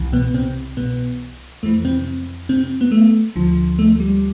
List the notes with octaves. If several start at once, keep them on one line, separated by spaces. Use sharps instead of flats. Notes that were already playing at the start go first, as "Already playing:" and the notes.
Already playing: C2 C3 E3
B2 B3
C3 C4
B2 B3
F2 E3 A3
C3 C4
C3 C4
B3
A3
D2 D3 F3
A3
G3